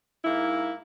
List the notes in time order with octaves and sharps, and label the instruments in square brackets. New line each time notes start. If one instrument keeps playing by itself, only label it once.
[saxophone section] G#2 A#3 E4